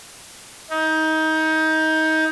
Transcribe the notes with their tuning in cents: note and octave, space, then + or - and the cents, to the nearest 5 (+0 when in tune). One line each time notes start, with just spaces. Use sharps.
D#4 +25